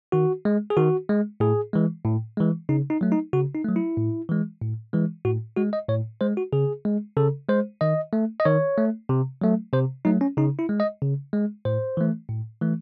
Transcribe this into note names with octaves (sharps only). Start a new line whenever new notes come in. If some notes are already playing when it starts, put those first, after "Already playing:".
D#3 F#4
G#3
G#4
D#3 F#4
G#3
A2 G#4
E3 G#3
A2
E3 G#3
C#3 D#4
D#4
F#3 A3
D#4
C#3 F#4
D#4
F#3 A3
E4
A2
E3 G#3
A2
E3 G#3
A2 F#4
G#3 F#4
D#5
A2 C#5
G#3 C5
F#4
C#3 G#4
G#3
C#3 A4
G#3 C5
D#3 D#5
A3
D#5
D#3 C#5
A3
C3
F#3 A3
C3 C5
F#3 A3 D#4
C#4
C#3 D#4
E4
G#3
D#5
C#3
G#3
A2 C5
E3 A3
A2
E3 A3